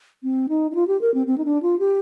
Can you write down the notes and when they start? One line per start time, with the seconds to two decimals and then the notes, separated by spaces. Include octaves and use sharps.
0.23 C4
0.49 D#4
0.71 D#4
0.75 F4
0.88 G4
1.01 A#4
1.14 C4
1.27 C4
1.38 D#4
1.45 D4
1.63 F4
1.79 G4